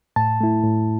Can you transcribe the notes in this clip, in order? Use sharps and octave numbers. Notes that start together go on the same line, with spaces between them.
A2 A5
A3 E4
A2